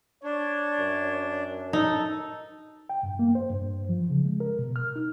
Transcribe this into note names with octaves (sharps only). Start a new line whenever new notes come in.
D4 C#5
F#2
D#4 A4
G5
G2
A#3
C5
G2
F3
C#3
G#3
A#4
B2
F6
D#4